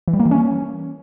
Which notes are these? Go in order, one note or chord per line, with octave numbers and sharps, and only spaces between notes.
E3
G3
A#3
E3
C#4